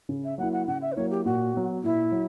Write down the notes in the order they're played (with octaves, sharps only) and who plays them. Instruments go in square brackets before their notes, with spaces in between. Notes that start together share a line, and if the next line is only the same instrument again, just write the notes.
[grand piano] C#3
[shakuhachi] E5
[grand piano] F#3 A#3 E4 [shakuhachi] F#5
[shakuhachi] F#5
[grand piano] C#3 [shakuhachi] F#5
[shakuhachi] E5
B4
[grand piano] F#3 A#3 E4 [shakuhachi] C#5
[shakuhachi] G4
[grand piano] A#2 [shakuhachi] F#4
[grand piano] F#3 B3
[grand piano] A#2 [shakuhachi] E4
[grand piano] F#3